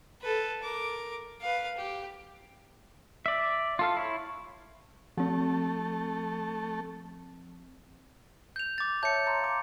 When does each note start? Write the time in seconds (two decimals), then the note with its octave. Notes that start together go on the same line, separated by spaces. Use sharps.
0.21 A4 B4
0.63 A#4 D6
1.41 B4 F5
1.77 G4
3.26 D5 E5
3.79 F4 A4 F5
3.97 E4 C#5
5.17 F3 A3 C4
8.56 G6 F7
8.78 D6 A6
9.03 C#5 E5 A5 G6 C#7
9.27 A#5 C6
9.41 F5 D6